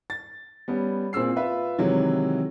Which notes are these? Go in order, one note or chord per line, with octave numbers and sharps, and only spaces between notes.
A6
G3 B3 C#4
A#2 C4 G#4 E6 C7
F4 B4 E5
C3 D#3 E3 F#3 G#3